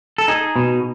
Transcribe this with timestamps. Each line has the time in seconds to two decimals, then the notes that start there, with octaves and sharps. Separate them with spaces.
0.18 A4
0.28 D#4 G#4
0.56 B2